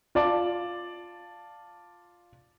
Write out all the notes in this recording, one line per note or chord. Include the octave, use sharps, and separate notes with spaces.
F4 D5 A5